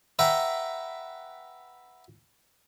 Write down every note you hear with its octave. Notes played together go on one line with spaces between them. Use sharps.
B4 E5 F#5 G5 A#5